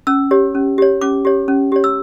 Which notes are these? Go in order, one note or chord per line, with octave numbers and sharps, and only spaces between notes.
C#4 E6
G4 C#5
C#4
G4 C#5
C#4 D6
G4 C#5
C#4
G4 C#5
E6